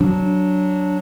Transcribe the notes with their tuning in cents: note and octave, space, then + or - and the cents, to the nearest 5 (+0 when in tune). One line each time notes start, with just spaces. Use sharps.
F#3 +0 D4 -10